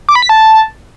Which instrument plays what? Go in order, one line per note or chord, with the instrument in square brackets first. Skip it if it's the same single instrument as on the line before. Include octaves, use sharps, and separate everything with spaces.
[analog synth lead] D6
B5
B6
A5